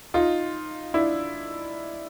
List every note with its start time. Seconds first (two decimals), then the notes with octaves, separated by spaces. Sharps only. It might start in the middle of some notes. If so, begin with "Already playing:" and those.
0.14 D#4 F4
0.94 D4 E4